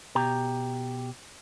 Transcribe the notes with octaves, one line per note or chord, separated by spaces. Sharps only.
B2 G4 A#5